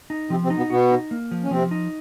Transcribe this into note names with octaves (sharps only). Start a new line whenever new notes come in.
D#4
C3 F3 C4
C3 C4
D#4
B2 B3
B2 B3 F#4
D#4
A#3
F3
C#4
C3 F3 C4
D#4